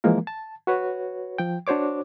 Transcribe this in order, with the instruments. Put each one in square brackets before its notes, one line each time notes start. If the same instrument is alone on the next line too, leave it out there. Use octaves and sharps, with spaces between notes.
[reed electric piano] E3 F3 G#3 A#3 A#4
A5
F#4 B4 C#5
F3 G5
D4 F#4 C5 C#5 D6